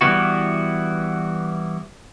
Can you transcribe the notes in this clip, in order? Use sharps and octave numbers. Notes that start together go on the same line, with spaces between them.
E3 G3 B3 E4 F#4